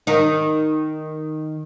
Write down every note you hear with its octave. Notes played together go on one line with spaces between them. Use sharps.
D#3 D#4